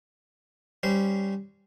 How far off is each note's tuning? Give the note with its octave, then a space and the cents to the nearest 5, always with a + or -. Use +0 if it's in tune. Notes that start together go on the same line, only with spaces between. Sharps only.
G3 +0 C#4 +0 C5 -20